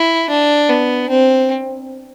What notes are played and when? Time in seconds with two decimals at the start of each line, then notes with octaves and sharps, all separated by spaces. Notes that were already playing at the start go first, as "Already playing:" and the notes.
Already playing: E4
0.30 D4
0.70 B3
1.10 C4